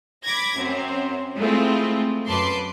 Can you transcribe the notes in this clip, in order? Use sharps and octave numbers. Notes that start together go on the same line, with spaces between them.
B5 D6 G#6 A#6
F#2 C4
G#3 A3 C4 E4 F4
F#2 B4 A5 C6 D6 C7